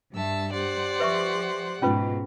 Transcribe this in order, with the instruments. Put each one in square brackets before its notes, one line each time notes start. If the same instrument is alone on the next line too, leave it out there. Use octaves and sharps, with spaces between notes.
[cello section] G2 [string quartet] E5 A5 E6
[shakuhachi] G4 [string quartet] C5 D5 F#5
[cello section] F3 [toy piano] B4 E5 C#6
[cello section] G#2 [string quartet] B2 [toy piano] C#4 F4 B4